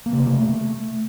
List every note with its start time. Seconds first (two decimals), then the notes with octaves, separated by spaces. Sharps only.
0.06 A#3
0.13 C3
0.20 A#3
0.26 C3
0.33 A3